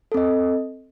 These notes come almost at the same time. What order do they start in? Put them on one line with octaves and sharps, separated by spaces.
A4 C4 D#5